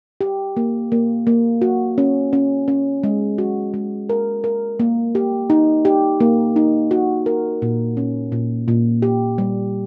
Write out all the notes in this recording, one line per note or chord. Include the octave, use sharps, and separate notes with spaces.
G4
A#3
A#3
A#3
F#4
C#4
C#4
C#4
G#3
F#4
G#3
A#4
A#4
A#3
G4
D#4
G4
A#3
D#4
F#4
A#4
A#2
C#4
A#2
A#2
G4
G3